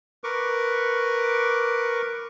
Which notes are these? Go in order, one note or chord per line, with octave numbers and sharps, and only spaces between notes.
A#4 B4 C#6 D6